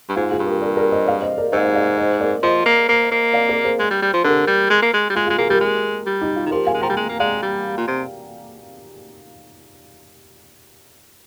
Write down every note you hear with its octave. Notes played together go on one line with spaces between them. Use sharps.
G2
G#2 F4 G#4
F4 G#4
G2
G4 A#4
A#4 D5
A#4 D5
C5 D#5
D5 F5
C5 D#5
A#4 D5
G#2 C5 D#5
D#5
D5 F5
C5 D#5
A#4 D5
F3 C5 D#5
A#3
A#3
A#3
D5 F5
A#4 D5
G#4 C5
G#3
G3
G3
F3
D3 G4 A#4
G3
G#3
A#3
G#3
G3
G#3 F4 G#4
F4 G#4
G#3
A#3 F4 G#4
G3 G4 A#4
G#3
G3
D#4 G4
F4
D#3
F3 G4 A#4
F5 G#5
G#3
F3 G5 A#5
G3
G#3
A#3
G#3 D5 F5
G3
A#2
C3